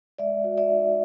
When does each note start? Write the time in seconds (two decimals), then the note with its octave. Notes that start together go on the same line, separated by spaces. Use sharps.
0.19 G#3 D5 E5
0.44 F#4
0.58 D5 E5
0.70 D#4